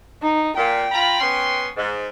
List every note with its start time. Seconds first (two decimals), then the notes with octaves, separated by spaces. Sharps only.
0.22 D#4
0.56 A#2 G5
0.92 F4 A#5 B5
1.20 B3 C#4 C6
1.77 G#2